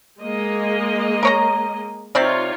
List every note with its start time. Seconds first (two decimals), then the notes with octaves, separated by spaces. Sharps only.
0.20 G#3 A#3 D#5
1.23 A#4 C#5 A#5
2.15 C3 C4 D#4 F4 C#5 D5